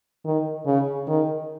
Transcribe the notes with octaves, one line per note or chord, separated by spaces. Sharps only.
D#3
C#3
D#3